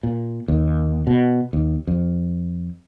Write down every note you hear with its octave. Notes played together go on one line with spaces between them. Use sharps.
A#2
D#2
B2
D#2
F2